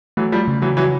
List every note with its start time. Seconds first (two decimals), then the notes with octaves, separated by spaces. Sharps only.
0.17 E3 F#3 A3
0.32 F3 G3
0.48 C#3
0.62 E3 F#3
0.77 E3 F#3